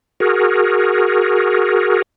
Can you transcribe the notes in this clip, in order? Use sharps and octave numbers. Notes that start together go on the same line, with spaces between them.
F#4 G#4 A#4